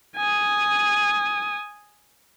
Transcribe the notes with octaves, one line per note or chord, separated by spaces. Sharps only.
G#5 D#6